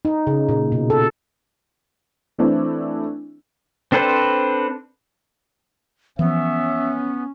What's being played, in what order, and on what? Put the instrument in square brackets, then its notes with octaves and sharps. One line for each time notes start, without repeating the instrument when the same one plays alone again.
[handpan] D#4
C#3
A#2
B2
A4
[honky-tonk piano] E3 A3 C4 D4 E4
[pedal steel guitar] C4 D4 A4 B4 C5
[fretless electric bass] E3 F3 [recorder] B3 [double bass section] C#4 [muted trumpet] E5